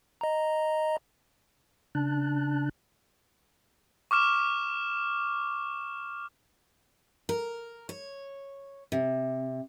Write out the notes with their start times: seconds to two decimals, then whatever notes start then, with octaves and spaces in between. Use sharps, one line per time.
0.21 D#5 A#5
1.95 C#3 D4 A5 F#6
4.11 C#6 D6 F6 E7
7.29 A#4
7.89 C#5
8.92 C3